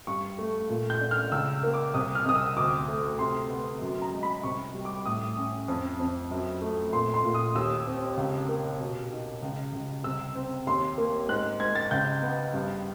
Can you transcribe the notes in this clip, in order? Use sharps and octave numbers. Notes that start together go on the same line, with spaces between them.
G2 C#6
A3
A#2
G6
D4
F6
C#2 E6
A#3
D6
C2 D#6
F6
C2 D#6
E6
D2 D6
A3
C3 C6
B3
F#2
A#5
G#3
B5
C2 C#6
G3
D6
A2 D#6
C#4
F2
F2
F#2
A3
A#2 C6
C6
A#2
D#6
D#2 E6
C4
C#2
A#3
B2
D#4
C#2
C#2
C2 E6
C4
D#2 C6
A#3
G#2 F#6
G#2 G#6
A6
C#2 G6
B3
G2